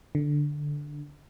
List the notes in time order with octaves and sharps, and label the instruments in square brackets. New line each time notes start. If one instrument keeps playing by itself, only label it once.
[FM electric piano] D3